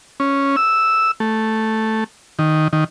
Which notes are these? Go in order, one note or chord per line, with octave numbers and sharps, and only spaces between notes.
C#4
E6
A3
D#3
D#3